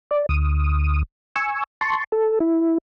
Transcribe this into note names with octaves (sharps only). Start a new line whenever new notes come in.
D5
D2 D#6
G#5 C#6 E6
A5 C6 C#6
A4
E4